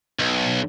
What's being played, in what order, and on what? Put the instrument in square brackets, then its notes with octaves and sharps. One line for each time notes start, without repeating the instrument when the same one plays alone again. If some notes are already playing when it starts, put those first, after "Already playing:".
[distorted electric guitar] B1